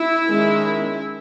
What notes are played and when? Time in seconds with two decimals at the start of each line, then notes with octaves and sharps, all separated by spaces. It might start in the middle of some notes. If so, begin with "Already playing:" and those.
Already playing: E4
0.27 D#3 G#3 C#4